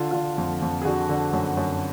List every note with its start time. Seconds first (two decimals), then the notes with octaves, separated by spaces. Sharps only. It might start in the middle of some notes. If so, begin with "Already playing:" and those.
Already playing: D3 F4
0.11 D3 F4
0.38 F2
0.62 F2
0.82 G#4
0.85 D3 F#4
1.09 D3
1.33 F#2
1.57 F#2